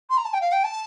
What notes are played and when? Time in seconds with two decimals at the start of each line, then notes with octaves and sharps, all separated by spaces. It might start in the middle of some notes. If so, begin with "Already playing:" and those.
0.09 C6
0.17 A#5
0.24 A5
0.33 G5
0.40 F5
0.51 G5
0.63 A5